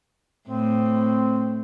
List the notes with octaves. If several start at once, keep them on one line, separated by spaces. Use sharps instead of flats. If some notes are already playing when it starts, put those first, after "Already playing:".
A2 C4